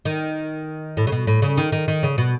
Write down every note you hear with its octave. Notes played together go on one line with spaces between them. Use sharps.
D#3
A2
C#3
B2
A2
C#3
D#3
D#3
D#3
C#3
B2